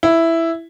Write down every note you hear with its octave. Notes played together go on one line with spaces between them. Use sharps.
E4